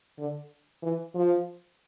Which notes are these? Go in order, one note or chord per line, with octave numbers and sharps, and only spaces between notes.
D3
E3
F3